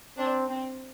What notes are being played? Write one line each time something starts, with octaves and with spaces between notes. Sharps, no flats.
C4 D4
C4